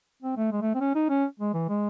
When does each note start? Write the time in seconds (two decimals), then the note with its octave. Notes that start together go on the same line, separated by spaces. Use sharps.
0.22 C4
0.37 A3
0.52 G#3
0.61 A3
0.74 C4
0.80 C#4
0.95 D#4
1.10 C#4
1.40 G#3
1.54 E3
1.69 G#3